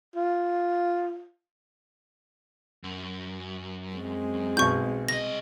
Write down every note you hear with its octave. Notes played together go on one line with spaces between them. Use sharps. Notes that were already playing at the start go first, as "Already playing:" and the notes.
F4
F#2
G#3 C4
B1 B2 C#6 G6
C2 D#5 A#6